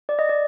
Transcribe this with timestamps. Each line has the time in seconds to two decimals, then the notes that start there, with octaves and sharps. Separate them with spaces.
0.09 D5
0.19 D#5
0.29 D5